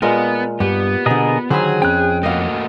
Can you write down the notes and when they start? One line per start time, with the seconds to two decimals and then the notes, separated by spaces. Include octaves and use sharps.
0.02 A#2 G#3 B3 A#4
0.60 G2 B3 G4
1.06 B2 D3 G#4 A#4 D#5
1.50 D3 D#3 F#3 G#4 C5 B5
1.82 F2 C#4 G5 F#6
2.23 A3 A#3 F#4 D#5 F5